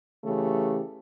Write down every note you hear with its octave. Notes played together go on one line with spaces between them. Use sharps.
C#3 E3 A3 G4